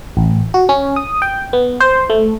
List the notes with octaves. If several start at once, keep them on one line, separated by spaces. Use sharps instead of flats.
A1
F#4
C#4
D#6
G5
B3
C5
A3